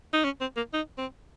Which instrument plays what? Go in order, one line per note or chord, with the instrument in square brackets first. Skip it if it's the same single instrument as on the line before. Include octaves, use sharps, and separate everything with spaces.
[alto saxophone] D#4
C#4
C4
A#3
D#4
C4